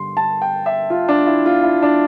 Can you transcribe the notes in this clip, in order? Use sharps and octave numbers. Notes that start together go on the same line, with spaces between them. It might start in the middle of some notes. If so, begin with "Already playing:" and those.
Already playing: G2 D3 C6
A5
G5
E5
F4
D4
E4
F4
E4
D4